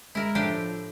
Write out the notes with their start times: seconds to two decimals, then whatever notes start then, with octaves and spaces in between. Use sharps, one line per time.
0.15 G#3 E4 A#4
0.35 A2 F3 D4 G4